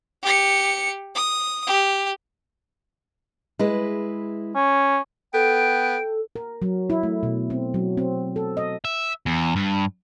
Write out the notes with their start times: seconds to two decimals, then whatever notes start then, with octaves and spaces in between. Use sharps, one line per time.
0.23 G4 C#7
1.15 D#6
1.67 G4
3.59 G#3 E4 B4
4.55 C#4
5.34 B3 A4 G5 D7
6.36 A#4
6.62 F#3
6.90 E4
7.03 A3
7.23 B2
7.50 C4
7.74 F#3
7.97 C4
8.36 A4
8.57 D#5
8.85 E5
9.26 E2
9.56 G2